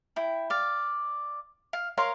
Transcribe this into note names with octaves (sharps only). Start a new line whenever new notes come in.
E4 G5
D5 F5
F5
A#4 C#5 F5 C6